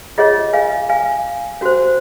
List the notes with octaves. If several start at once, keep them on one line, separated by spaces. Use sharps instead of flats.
F4 G#4 C#5 D#5 F#5
F5 G#5
F5 G#5
C#4 F#4 C5